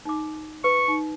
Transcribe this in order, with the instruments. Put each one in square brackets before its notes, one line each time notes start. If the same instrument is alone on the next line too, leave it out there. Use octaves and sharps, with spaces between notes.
[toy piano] D#4 D6
[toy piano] B4 [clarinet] C#6
[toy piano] D#4